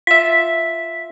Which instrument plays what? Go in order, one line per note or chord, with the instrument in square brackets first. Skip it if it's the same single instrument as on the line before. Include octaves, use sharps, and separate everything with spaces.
[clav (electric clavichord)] F4 E5 [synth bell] B6